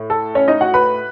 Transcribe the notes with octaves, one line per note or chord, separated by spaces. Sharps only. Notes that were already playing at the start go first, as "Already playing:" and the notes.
Already playing: A2
A4
C#4 C#5
D#4 D#5
F#4 F#5
B4 B5